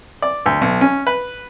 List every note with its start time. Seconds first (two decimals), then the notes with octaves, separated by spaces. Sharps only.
0.22 D5
0.46 D2
0.61 B1
0.81 C#4
1.07 B4